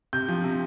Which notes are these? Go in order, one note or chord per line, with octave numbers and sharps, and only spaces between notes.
C3 G6
F3
C3